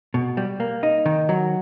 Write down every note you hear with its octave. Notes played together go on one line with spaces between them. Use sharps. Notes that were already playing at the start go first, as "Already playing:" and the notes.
B2
G3
A#3
D#4
D#3
F#3